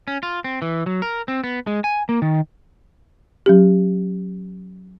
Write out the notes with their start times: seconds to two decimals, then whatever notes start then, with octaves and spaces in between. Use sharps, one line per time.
0.08 C#4
0.23 F4
0.44 C4
0.62 E3
0.86 F#3
1.02 A#4
1.28 C4
1.44 B3
1.67 G#3
1.84 G#5
2.09 A#3
2.22 D#3
3.46 F#3 C#4 G4